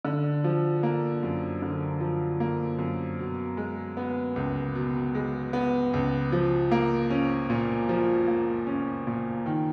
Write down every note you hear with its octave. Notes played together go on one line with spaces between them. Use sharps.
D3
F3
A#3
F#2
D3
F3
A#3
F#2
B2
G#3
B3
C#2
B2
G#3
B3
C#2
F3
A#3
C#4
A#2
F3
A#3
C#4
A#2
D#3